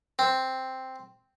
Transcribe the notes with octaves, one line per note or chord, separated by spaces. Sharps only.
C4